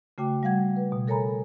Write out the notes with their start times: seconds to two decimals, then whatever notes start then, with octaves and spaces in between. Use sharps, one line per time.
0.18 C#3 A3 F#4 G5 D6
0.43 G3 F5 F#5 G#6
0.76 B4
0.92 B2
1.07 A4 A#4 C#5 G#5 A#5 B5